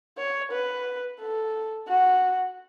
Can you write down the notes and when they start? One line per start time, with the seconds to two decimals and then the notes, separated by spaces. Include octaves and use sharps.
0.18 C#5
0.51 B4
1.20 A4
1.88 F#4